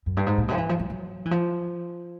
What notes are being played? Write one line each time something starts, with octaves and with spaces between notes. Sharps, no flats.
F#2
G2
G#2
A#2
B2
F3
E3
F3
F#3
F#3
E3
F3